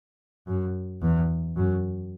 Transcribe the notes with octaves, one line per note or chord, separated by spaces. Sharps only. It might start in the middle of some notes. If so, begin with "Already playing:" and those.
F#2
E2
F#2